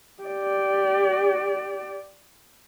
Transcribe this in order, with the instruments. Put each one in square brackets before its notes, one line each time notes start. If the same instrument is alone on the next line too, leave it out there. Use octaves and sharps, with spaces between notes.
[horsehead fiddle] G4 D5